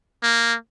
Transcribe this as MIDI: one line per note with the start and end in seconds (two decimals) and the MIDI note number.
0.23 0.54 58